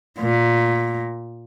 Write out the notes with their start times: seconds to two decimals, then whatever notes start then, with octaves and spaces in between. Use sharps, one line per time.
0.20 A#2